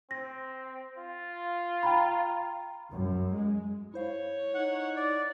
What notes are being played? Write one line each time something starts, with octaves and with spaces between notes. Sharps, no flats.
C4 A#6
F4
G5 A#5 B5
F#2
G#3
E4 C5 C#5 F5
D#4 F#5
D5